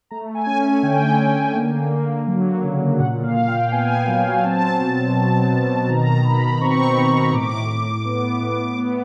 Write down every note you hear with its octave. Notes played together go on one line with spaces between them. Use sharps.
A3 A#5
G#5
C#4
G#5
D3 G5
D3
A#3
A#3
F#3
C#3
A#2 F#5
F5
A#2
G5
B3 G#5
F#3
C4 A5
B2
B2
B2
D#3 A#5
D#3 B5
C4 C#6
D#3
A2 D6
A2
B3
A2
B3